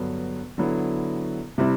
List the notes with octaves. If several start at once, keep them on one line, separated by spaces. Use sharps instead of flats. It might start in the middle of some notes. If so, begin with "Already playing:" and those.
Already playing: G2 D3 F#3 B3
D3 F#3 B3 E4
C3 G3 C4 E4